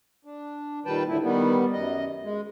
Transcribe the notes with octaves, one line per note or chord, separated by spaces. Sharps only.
D4
A#2 D#3 G3 B4 G5 A5
A2 D3 E4
D#3 G3 B3
F#2 D#5
G#3